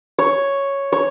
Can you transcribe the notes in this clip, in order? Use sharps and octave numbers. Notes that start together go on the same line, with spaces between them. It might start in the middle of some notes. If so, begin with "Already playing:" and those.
C#5
C#5